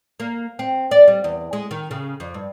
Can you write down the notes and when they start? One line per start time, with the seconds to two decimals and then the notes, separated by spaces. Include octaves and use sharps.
0.20 A#3
0.59 C4
0.91 D5
1.08 G3
1.24 E2
1.53 G#3
1.71 D#3
1.91 C#3
2.20 F2
2.34 G2